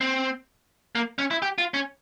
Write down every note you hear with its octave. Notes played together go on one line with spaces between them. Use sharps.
C4
A#3
C#4
E4
G4
F4
C#4